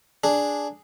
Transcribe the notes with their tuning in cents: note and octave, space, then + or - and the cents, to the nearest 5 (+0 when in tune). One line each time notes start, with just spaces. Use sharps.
D4 +0 G#4 +0